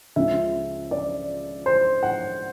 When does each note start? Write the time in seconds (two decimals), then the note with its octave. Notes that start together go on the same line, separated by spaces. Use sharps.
0.16 C#2 C#3 F3 E5
0.91 D5
1.66 C5
2.03 F#5